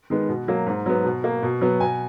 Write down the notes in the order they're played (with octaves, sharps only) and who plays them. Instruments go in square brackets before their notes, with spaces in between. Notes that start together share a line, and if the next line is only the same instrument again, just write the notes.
[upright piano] D#3 G#3 B3
B2
F#3 A#3
G#2
F#3 B3
B2
A#3
B2
F#3 B3
B2 G#5